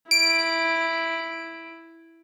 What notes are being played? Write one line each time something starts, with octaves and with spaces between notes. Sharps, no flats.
E4 D7